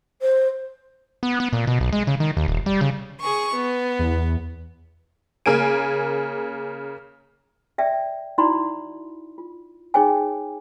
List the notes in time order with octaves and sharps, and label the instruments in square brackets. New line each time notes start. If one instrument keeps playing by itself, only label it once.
[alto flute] C5
[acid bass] B3
B3
A#2
B2
B1
G#3
C#3
D#3
D#2
D#1
G3
C#3
[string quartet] G#4 C#6
B3
[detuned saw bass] E2
[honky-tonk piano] C#3 A#3 G#5 D7
[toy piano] D5 E5 G5
D#4 E4 F#4 D5 B5 C6
F4
D#4 G#4 C#5 G5 G#5